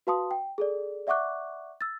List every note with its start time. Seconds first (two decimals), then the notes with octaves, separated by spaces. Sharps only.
0.07 F#4 B4 F5 A5 C6 D#6
0.31 G5
0.58 G#4 A4 D5
1.07 D5 E5 F#5 C#6 D6 F#6
1.81 E6 A6